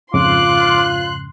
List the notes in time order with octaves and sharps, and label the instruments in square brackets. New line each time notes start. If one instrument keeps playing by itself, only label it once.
[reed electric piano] F2 G#2 C#3 [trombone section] F4 [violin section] C6 F#6 [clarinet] D6